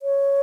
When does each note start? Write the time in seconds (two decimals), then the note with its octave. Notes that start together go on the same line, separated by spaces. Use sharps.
0.02 C#5